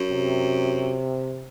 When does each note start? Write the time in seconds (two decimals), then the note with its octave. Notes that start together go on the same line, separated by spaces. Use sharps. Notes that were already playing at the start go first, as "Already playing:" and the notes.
Already playing: F#2
0.11 C3